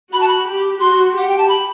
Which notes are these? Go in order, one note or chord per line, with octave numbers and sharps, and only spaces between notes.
F#4 B5
A5
B5
G4
F#4 C6
G4 F#5
G5
A5
B5